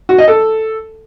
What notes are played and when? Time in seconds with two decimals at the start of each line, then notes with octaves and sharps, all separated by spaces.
0.09 F#4
0.18 D#5
0.28 A4